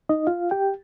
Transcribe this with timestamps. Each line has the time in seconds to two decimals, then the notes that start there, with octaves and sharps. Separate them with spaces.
0.09 D#4 D#5
0.27 F4 F5
0.51 G4 G5